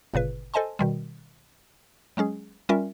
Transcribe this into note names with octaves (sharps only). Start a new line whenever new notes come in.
G1 A#2 C#3 B4
A4 C5 D#5 G#5 A5 C6
B2 D#3 G3
F#3 G#3 C#4 G#4
G3 C#4 F4 A#4 E5